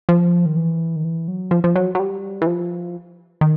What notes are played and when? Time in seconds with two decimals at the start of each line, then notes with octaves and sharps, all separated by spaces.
0.09 F3
0.46 D#3
0.57 E3
0.96 D#3
1.04 E3
1.28 F#3
1.51 F3
1.64 F3
1.76 F#3
1.95 F#3
2.00 G3
2.42 E3
2.47 F3
3.41 D#3